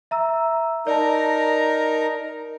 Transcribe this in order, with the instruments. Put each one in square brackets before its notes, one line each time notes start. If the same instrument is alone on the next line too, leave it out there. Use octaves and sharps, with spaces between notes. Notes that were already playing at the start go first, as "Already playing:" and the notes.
[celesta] E5 A#5 E6
[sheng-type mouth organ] D#4 A#4 A#5 [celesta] D5 A5